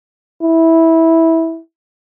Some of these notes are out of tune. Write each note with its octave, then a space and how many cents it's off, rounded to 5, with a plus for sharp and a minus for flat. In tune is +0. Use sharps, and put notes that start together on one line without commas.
E4 -15